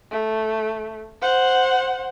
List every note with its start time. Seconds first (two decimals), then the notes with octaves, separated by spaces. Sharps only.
0.11 A3
1.22 C5 F#5